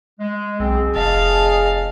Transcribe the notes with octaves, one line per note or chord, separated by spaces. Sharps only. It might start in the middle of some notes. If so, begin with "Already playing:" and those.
G#3
B1 C4 G#4
F1 D#5 F5 A5